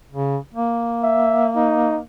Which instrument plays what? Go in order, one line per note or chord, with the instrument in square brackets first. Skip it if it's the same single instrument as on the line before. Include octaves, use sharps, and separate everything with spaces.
[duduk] C#3
A#3
[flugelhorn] E5
D#4